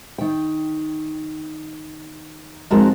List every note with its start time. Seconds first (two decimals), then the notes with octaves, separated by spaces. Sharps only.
0.18 D#3 G5
2.71 F2 D#3 G#3 F#4 A#4 A5